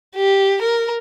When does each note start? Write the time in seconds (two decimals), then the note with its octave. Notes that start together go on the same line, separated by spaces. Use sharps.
0.16 G4
0.62 A#4